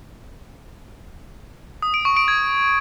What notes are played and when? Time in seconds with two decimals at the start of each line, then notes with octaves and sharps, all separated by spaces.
1.82 D#6
1.94 D7
2.05 C#6
2.17 D7
2.28 G#6